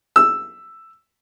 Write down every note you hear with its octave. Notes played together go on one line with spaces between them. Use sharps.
E6